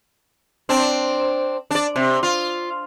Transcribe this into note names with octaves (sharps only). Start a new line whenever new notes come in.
C4 D4
D4 D5
C3
F4